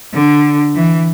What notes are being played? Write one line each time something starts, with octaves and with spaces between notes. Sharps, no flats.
D3
E3